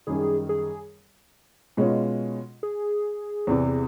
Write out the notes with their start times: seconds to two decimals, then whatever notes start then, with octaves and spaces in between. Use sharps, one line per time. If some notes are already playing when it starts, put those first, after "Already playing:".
0.07 F#2 D#3 G3 G#4
0.49 G#4
1.77 B2 G#3 C#4 F4
2.63 G#4
3.47 E2 C3 E3